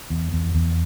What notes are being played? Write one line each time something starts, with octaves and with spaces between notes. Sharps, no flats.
E2
E2
E2